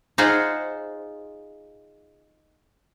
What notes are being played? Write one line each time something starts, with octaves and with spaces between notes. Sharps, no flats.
D#4 F4 G#4 C5 F#5